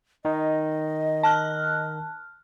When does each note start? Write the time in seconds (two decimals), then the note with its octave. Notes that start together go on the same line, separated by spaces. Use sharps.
0.25 D#3 D#4 D#5
1.23 A5 F6 F#6